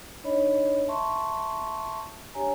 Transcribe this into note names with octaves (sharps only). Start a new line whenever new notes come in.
D4 D#4 C#5 D#5 B5
E5 A5 C6 C#6
D4 G4 C#5 G#5 A#5